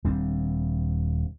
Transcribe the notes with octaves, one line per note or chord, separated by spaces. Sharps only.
D#1 G3 C4 D4